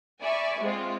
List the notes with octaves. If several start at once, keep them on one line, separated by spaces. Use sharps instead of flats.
D5 E5 G#5 B5 C#6
G#3 C4 F4